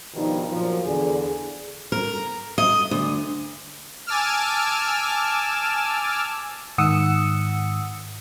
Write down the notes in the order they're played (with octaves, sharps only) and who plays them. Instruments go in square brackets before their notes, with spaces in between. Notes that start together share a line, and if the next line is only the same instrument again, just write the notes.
[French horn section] G2 B2 D#3 F3 D#4 F4
A#2 F3 F#3
E2 D3 G#4
[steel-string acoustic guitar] A#4
D#5
D2
[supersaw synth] G#5 A5 D6 E6 F6
[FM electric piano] G#2 D#3 F#5 D#6 E6 C#7